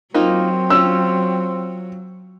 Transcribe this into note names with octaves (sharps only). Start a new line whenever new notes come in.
F#3 A#3 C4 D#4 F4
C#4 F4 E6